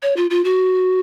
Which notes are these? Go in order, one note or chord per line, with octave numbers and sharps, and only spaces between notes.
C#5
F4
F4
F#4